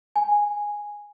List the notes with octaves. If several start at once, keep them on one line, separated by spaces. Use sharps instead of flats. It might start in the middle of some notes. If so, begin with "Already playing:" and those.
G#5